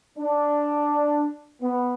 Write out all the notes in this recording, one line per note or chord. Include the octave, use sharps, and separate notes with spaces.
D4
B3